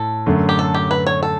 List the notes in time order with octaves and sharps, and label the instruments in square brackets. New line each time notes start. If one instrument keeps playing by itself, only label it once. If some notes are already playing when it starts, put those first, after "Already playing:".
Already playing: [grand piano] A2 [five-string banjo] A4
[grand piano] F#2 D3 A3
[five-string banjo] G4
A4
G4
B4
C#5
A4